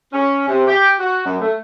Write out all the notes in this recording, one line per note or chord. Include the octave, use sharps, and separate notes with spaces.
C#4
C3
G4
F#4
F#2
A3